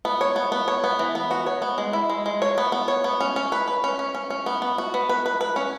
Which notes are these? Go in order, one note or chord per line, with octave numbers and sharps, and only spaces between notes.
B3
C#5
B3
B3
C#5
B3
E3
B3
F#4
C#5
B3
G#3
E4
G#3
G#3
C#5
B3
B3
C#5
B3
C#4
C#4
B4
B4
C#4
C#4
C#4
C#4
B3
B3
F#4
B3
B4
B4
B4
C#4